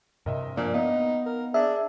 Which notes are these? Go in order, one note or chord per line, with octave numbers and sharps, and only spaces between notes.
G2 C3 A#4 D#5 E5
A#2 F3 A#3 D4
B3 D#4 F5 A#5
A#4
D4 G#4 E5